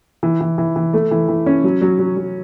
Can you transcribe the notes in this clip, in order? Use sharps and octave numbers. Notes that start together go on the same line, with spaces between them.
E3
E3
E3
E3
A3
E3
E3
C#4
F#3
F#3
F#3
F#3